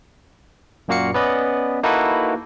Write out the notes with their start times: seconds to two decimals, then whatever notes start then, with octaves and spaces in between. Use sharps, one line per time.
0.88 F#2 A#2 A#3 F#4 F5 C#7
1.14 B3 C#4 B4 D5 D#5
1.83 A#3 D#4 E4 F#4 A4 B4